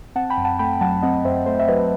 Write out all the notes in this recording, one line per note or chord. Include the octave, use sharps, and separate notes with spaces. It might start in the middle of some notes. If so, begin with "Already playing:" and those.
C4 F#5 A5
G5 B5
F#2
F#5 A5
A3 G5 B5
F#3 F#5 A5
C4 D#5 F#5
F#2 C5 E5
A3 C5
E5
F#3 B4 D#5